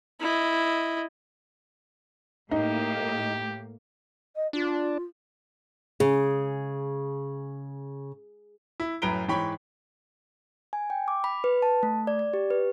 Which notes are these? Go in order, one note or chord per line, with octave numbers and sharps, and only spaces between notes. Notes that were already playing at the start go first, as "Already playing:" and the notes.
E4 D#5
A2 A#3 D#4 G4
D#5
D4 F4
C#3 G#4
E4
F#2 A2 B4 A#5 D7 G7
G#2 E3 C#5 G5 B5 C#6
G#5
G5
D6
B5
B4
A5
A3
D5
D5
G4
B4